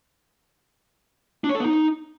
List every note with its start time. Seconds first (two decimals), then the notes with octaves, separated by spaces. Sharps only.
1.44 D4
1.49 C#5
1.55 A4
1.60 B3
1.65 D#4